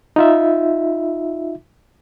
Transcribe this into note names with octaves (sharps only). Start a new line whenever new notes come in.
D#4 F4 E5